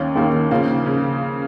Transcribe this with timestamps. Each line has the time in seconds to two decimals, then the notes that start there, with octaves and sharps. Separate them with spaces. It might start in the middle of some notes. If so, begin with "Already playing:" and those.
Already playing: D#2 D#3 A#3 C#4
0.15 D#2 D#3 A#3 C#4
0.51 C#3 F3 A#3
0.86 C#3